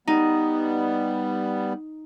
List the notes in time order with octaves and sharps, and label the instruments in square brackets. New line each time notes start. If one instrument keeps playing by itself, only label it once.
[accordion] G3 B3 [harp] D#4